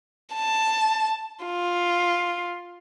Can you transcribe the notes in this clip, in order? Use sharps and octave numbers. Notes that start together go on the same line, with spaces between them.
A5
F4